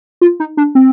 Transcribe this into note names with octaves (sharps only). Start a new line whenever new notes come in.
F4
D#4
D4
C4